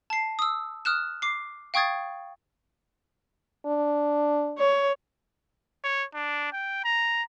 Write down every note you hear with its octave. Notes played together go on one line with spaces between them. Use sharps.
A5 C7
D#6 E6
D#6 F6 F#6 E7
D6 C7
F5 G5 C#6 D#6 G#6 A6
D4
C#5
C#5
D4
G5
A#5